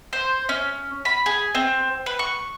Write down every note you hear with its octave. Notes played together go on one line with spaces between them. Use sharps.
C5
C#4
B5
G#4
C4
B4
C#6